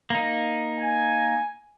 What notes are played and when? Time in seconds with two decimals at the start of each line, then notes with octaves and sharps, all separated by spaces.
0.10 A#3 D#4
0.79 G#5